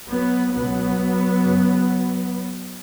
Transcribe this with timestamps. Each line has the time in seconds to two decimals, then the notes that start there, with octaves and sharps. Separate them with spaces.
0.09 F#3 B3
0.53 C#2 B2 F#3 B3
1.41 F#2 C#3